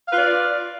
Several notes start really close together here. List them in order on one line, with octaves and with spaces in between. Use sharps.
F5 B4 F4 D5